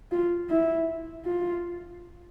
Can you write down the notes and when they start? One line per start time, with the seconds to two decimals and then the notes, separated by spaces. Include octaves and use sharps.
0.12 F4
0.50 E4
1.26 F4